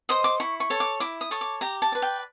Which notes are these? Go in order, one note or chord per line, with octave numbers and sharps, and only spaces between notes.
C5 D#5 D#6
D6
E4 C#6
C#6
A4 C#5
D6
E4 D6
D#6
A4 C#5
D6
G4 A#5
A5
B4 D5
G5